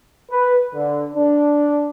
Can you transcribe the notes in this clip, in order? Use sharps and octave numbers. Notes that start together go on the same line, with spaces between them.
B4
D3
D4